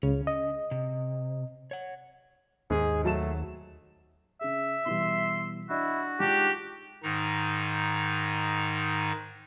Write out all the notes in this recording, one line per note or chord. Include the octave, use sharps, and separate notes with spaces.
C#2 C#3 C#4
D#5
C3
C#5 F#5
D#2 G#2 G#4
F#3 A3 A5 E7
C#3 G#4 E5
B2 E3 G3 C6
D4 E4 F#4 D5 D#5
G#3 D4 D#4 F4 G4
G#2 D#3 D#4